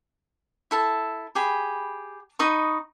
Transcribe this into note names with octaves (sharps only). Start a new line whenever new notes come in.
E4 A4 A5
G4 G#4 B5
D#4 D#5 B5 C#6